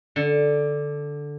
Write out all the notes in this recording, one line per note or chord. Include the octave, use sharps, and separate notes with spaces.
D3